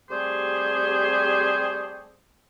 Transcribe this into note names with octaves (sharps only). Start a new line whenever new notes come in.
C3 G3 A3 G4 G#4 C5